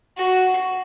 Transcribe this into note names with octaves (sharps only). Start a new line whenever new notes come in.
F#4